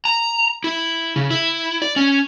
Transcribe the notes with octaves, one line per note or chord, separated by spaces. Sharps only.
A#5
E4
C#3
E4
D5
C#4